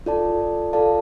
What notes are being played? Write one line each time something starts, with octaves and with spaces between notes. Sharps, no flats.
F4 A4 D5 A5
F4 A4 D5 F5 A5